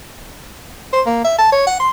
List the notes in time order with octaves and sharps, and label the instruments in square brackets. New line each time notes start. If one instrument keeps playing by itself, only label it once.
[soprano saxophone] C5
A#3
E5
A5
C#5
F#5
C6